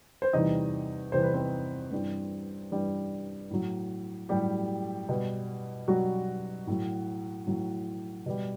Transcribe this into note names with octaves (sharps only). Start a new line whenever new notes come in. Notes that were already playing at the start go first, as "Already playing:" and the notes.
C5
E2 C3 E3 G3 D#4 D#5
E2 C3 E3 G3 C5
B4
C4 C5
G2 E3 G3
G2 E3 G3
A2 F#3
A2 F#3 G3 G4
B2 G3
B2 F#3 G3 F#4
A2 F#3
A2 F#3
B2 G3